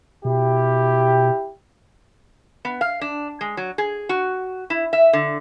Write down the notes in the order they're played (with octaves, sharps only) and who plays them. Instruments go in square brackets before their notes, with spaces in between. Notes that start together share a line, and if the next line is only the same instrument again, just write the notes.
[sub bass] B2 [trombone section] E4 G4
[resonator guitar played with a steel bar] B3
F5
D4
G#3
F#3
G#4
F#4
E4
E5
D3